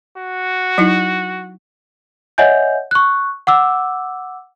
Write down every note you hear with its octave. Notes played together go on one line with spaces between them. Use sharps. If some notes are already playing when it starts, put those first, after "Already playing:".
F#4
F#3 D#4 E4
C#5 D#5 E5 F#5 G#5 G6
C#6 F#6
F#5 D6 E6